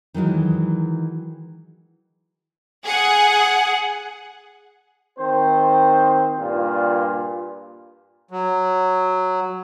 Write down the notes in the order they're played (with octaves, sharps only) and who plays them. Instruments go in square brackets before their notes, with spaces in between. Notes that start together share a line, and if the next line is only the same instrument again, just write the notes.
[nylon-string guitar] D#3 E3 F#3 G#3
[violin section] G#4 F#5
[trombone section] D#3 C4 C5
G2 A#2 F4
[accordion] F#3